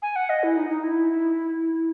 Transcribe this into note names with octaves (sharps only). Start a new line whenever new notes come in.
G#5
F#5
D#5
E4
D#4
D#4
E4